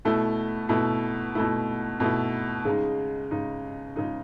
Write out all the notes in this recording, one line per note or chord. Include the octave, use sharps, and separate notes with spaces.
B2 A3 E4
B2 A3 E4
B2 A3 E4
B2 A3 E4
C#3 G#3 D#4
C#3 G#3 D#4
C#3 G#3 D#4